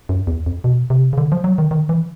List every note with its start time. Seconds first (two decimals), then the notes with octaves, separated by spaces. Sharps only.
0.09 F#2
0.27 E2
0.46 F2
0.64 B2
0.90 C3
1.13 C#3
1.18 D3
1.32 F3
1.44 F#3
1.58 D#3
1.71 D#3
1.89 E3